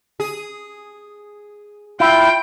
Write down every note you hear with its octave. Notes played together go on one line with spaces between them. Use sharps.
G#4
E4 F4 G5